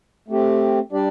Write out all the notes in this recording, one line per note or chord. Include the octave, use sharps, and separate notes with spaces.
A3 C4 G4
G3 D4 G4 D5